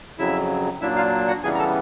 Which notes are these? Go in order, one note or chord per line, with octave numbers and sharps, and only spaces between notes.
F2 C#3 F#3 E4 E5
A#2 F#3 A#3 D4 E4 E5
F4 F5
F#4 F#5
C#3 E3 G3 B3 G#4 G#5
A#5
A4 A5